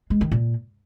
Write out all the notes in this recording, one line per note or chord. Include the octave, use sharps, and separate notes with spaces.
G#3
D#3
A#2